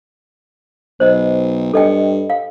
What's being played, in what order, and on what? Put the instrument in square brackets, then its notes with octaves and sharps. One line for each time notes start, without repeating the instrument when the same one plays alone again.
[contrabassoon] B1 [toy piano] C5 D#5
[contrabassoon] G2 [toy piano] A4 D#5 G5
[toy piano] F5